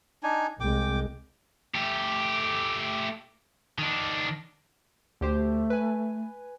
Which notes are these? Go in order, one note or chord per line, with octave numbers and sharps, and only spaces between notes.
D4 D#4 G#5
C2 G#3 G5 D6
A3 G4
D#3 D4
D2 A3 G4 C5
B4 G#5